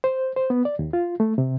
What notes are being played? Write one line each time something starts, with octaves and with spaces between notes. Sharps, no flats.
C5
C5
B3
D5
D#2
F4
A3
C3